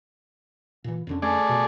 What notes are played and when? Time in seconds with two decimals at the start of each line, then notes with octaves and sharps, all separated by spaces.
0.84 A#2 E3
1.07 F2 D3 C#4
1.22 A3 G#4 D5
1.49 B2